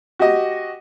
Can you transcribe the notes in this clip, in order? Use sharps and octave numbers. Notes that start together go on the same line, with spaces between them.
F#4 G4 D#5